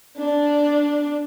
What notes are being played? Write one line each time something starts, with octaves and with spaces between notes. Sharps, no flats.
D4